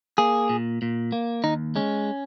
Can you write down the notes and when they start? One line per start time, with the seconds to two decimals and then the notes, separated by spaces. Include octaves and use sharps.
0.18 A#3 G#4
0.49 A#2
0.82 A#2
1.12 A#3
1.44 D#2 D#4
1.76 G#3 C#4